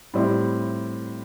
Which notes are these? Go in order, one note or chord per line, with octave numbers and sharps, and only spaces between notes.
A2 G3 C4 E4